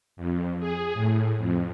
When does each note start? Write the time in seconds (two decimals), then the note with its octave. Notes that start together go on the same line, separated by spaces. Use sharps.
0.17 F2
0.60 G#4
0.94 A2
1.38 F2